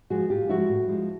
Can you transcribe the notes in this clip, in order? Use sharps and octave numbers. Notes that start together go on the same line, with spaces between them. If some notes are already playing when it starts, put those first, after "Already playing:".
F3 G#3 F#4 G#4
A2 F4 G4
F3 G#3 E4 F#4
A2
F3 G#3